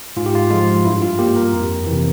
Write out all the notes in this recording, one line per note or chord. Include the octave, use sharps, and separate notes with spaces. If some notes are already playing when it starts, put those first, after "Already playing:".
G#2 F4
G4
F4
F3 G#3 F4
G2 E4
F4
G3 A#3 G4
A#4
F2
C3 E3